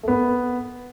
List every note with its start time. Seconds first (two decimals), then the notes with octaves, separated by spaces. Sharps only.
0.03 A3
0.08 B3